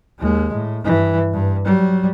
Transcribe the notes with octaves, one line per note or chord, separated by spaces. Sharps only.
D#2 G#3
A2
G2 E3
G2
F#3 G3